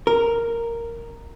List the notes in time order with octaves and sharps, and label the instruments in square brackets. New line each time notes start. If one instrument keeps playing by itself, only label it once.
[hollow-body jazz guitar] A#4